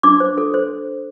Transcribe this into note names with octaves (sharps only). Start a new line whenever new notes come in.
D4 D6
C5
A4
C5